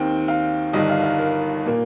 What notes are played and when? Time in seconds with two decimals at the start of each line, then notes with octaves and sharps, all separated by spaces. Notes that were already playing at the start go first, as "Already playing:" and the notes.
Already playing: D#2 D#3 C4 G5
0.28 F5
0.73 G1 G2 D#3 D#5
0.89 F5
1.03 F5
1.19 A#4
1.66 A#2 A#3